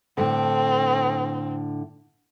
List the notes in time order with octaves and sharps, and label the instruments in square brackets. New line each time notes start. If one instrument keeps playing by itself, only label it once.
[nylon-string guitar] A2 D3 [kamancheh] C4